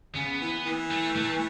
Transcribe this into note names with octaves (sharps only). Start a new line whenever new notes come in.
C#3 B3
E3
E3
A3
A3